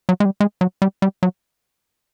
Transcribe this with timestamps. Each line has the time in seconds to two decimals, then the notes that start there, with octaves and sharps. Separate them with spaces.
0.09 F#3
0.20 G#3
0.25 G3
0.40 G#3
0.61 F#3
0.82 G3
1.02 G3
1.23 F#3